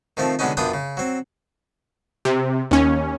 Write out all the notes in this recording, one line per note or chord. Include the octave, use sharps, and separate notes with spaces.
D#3 F3 A3 C4
D3 F#3 G#3 B3 C#4 D#4
F#2 B3 D4 F4 G5 D#6
C#3
F#3 C4
C3
D#2 C#4